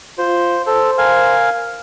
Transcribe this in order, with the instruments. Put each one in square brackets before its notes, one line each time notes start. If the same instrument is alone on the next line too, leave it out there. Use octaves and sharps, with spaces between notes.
[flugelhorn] F4 [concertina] C5
[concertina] A4 [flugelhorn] C5
[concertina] A#4 F5 G#5